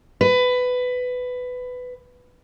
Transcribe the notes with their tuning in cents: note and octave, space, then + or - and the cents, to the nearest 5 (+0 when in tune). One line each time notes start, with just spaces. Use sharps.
B4 +15